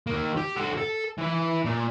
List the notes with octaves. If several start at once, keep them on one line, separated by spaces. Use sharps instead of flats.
D#3 A#3
G4
F#4 A4
A4
E3 B4
A#2